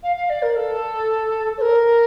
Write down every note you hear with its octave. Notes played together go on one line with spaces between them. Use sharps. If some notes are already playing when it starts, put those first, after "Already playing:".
F5
F5
D5
A#4
A4
C#5
A#4